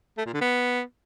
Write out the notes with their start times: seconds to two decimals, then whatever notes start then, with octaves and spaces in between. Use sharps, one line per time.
0.18 A3
0.26 A#2
0.34 D3
0.41 B3